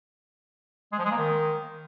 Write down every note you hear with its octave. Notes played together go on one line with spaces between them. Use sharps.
G#3
F3
G#3
A#3
D#3